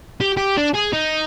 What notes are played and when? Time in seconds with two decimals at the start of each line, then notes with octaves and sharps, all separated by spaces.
0.21 G4
0.37 G4
0.57 D4
0.74 G#4
0.93 D#4